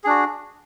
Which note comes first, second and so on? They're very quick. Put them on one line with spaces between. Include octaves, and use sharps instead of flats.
G#4 D4 F#4